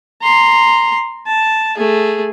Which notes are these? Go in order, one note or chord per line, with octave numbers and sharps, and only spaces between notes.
A#5 C6
A5
A3 G#4